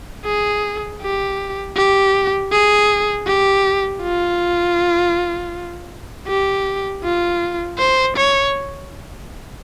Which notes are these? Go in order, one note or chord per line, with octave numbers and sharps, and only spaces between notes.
G#4
G4
G4
G#4
G4
F4
G4
F4
C5
C#5